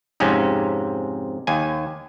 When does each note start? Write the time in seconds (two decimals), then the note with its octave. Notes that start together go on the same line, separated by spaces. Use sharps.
0.20 F2 G#2 C3 C#4
1.47 D#2 G#5